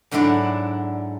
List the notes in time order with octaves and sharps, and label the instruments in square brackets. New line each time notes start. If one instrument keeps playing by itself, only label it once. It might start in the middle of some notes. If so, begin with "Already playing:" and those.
[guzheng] G#2 D3 F#3 D4 E4 D5